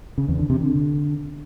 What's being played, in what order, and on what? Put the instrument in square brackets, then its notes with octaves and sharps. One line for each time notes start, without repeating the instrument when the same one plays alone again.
[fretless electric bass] C#3
E2
D3
C3
D3